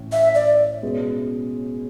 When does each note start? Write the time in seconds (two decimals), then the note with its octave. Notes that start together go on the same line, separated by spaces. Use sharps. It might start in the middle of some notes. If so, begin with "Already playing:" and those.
Already playing: A2 E3 C#4
0.12 E5
0.35 D5
0.83 B2 G#3 C#4 G#4 B4